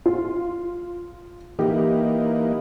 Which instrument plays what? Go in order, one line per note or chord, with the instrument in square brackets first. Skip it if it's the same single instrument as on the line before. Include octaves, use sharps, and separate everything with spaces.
[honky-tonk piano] F4
[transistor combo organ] E3 A#3 D#4 [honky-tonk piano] G4